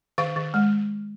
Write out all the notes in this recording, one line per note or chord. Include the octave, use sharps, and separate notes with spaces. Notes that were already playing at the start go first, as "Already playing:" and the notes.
D#3 F5
D#3
G#3